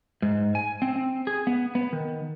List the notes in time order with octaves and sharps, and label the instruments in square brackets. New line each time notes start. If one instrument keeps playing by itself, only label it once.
[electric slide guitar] G#2
G#5
C4
C4
G#4
B3
B3
D#3